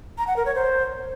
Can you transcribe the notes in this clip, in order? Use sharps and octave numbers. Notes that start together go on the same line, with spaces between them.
A#5
F#5
A#4
C#5
C5